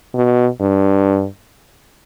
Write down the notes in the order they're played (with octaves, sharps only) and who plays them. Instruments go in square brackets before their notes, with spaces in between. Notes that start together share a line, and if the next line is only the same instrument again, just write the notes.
[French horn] B2
G2